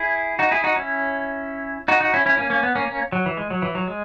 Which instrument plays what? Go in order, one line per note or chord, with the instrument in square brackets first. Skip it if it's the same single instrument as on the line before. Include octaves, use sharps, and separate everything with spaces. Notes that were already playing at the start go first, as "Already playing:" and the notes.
Already playing: [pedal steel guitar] E4 G#4
D#4 F#4
E4 G#4
D#4 F#4
C#4 E4
D#4 F#4
D#4 F#4
C#4 E4
C#4 E4
A#3 C#4
A#3 C#4
B3
A#3 C#4
A#3 C#4
F#3
E3
G#3
F#3
E3
F#3
G#3